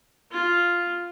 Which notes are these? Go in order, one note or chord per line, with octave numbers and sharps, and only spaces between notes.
F4